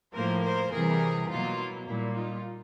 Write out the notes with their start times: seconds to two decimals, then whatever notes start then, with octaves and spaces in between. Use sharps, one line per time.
0.14 A2 F3 A#3 A#4 C5
0.43 A#4 C5
0.72 C3 E3 G3 G#4 A#4
1.29 B2 F#3 A#3 D#4 F4
1.58 E4
1.86 A#2 G3 A#3 E4
2.15 D#4 F4